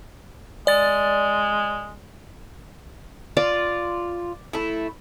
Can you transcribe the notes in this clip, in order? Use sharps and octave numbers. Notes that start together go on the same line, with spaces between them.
G#3 D5 A6
F4 D5
A3 E4